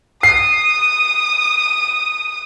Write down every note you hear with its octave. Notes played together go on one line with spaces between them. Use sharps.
D#6 C7